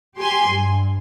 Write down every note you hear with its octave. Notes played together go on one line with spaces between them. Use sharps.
G4 G#5 C6
G2